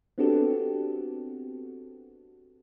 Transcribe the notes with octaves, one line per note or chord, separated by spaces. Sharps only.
B3 C4 D4 F#4 G4 A4